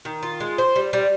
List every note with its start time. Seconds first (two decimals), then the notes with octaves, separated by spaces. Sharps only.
0.05 D#3
0.23 F4
0.40 G#3
0.58 C5
0.76 G3
0.93 G3